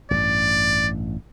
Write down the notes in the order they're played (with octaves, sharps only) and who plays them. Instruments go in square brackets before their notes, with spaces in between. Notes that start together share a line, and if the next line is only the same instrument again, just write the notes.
[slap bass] A1 G2 [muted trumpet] D5